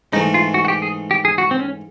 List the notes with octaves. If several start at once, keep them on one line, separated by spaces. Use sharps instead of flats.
G#2 E3 A3 D#4
F4
F#4
F#4
G4
G#4
G4
G#4
F#4
C4
C#4